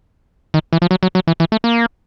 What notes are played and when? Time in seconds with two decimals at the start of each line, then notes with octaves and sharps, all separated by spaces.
0.54 D#3
0.73 E3
0.82 F3
0.91 F#3
1.03 F#3
1.15 F#3
1.27 E3
1.40 E3
1.52 A3
1.64 A#3